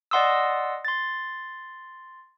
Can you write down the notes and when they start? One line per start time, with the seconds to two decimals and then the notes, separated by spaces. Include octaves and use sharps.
0.11 D5 D#5 F#5 C6 D#6 E6
0.85 C6 A6